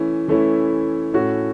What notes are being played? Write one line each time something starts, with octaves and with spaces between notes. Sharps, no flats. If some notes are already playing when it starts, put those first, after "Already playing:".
Already playing: E3 A3 C#4 E4
E3 A3 C#4 E4
A2 A3 C#4 F#4